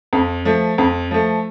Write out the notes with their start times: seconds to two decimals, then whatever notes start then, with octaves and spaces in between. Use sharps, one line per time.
0.13 F2
0.45 F3 A3
0.78 F2
1.11 F3 A3